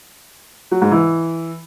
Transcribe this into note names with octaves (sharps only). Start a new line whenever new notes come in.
F#3
G#2
E3